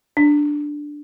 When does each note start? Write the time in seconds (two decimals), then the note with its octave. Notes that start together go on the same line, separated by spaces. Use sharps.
0.17 D4